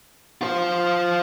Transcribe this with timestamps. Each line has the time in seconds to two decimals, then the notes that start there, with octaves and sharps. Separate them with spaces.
0.41 F4 C5